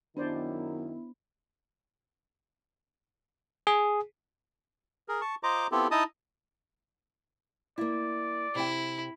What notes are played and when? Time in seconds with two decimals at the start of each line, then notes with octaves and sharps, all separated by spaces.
0.17 F#2 D#3 B3 D4 E4 C5 D5
3.67 G#4
5.08 G#4 A#4
5.21 A5 C#6
5.43 F4 C5 D#5 A#5 D6
5.72 B3 C4 E4 F4 G4 A4
5.91 D#4 E4 D#5 A5 D#6
7.78 A#3 E4 D5
8.55 C3 E4 G5